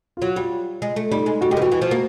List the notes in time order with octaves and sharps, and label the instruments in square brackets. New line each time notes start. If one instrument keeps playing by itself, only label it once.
[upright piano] F4
[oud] F#3 [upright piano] F#4
[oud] G3 [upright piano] F4
[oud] G#3
A3
[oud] G3 [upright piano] D#4
[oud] G#3
[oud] G3 [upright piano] F#4
[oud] G#3 [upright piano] G4
[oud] D#3
[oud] E3 [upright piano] F#4
[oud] E3 [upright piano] F#4
[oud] F3
A#3